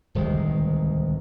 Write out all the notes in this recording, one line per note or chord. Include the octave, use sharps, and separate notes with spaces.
D1 C2 D#3 G#3